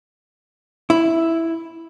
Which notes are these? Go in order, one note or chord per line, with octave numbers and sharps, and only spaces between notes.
E4